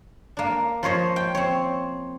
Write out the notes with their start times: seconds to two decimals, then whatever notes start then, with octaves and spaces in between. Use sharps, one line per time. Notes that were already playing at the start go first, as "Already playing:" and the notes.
0.37 A#3 D4
0.83 F3 C5 C#5 D#5
1.16 G5
1.35 C4 C#5